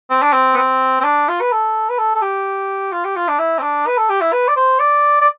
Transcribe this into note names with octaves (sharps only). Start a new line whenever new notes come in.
C4
D4
C4
B3
C4
C4
D4
F4
B4
A4
B4
A4
A4
G4
F4
G4
F4
D4
E4
C4
D4
B4
A4
G4
E4
B4
D5
C5
D5
D5